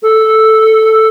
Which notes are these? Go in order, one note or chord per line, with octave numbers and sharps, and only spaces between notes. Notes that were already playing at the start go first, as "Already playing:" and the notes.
A4